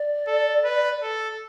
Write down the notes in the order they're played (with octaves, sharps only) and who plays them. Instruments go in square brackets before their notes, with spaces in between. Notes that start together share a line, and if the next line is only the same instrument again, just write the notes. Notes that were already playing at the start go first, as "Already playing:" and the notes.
Already playing: [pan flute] D5
[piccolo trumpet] A4
B4
A4